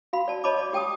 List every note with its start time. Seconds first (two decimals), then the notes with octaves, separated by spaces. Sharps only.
0.13 F#4 F5 B5
0.28 D5 A5
0.44 C#5 D#5 A5 B5 C#6 D6
0.58 D5
0.73 G4 G5 A5 D6 D#6